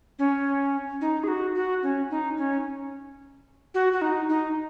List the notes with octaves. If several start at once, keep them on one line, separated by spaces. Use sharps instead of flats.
C#4
D#4
G#4
F#4
F#4
C#4
D#4
C#4
F#4
F#4
D#4
D#4